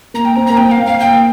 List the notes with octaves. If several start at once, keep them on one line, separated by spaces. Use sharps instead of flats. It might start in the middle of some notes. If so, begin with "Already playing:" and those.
A#3 A#5
G5
C4 A#5
A#3 A#5
C4 G5
F5
A#3
F5
A#3 G5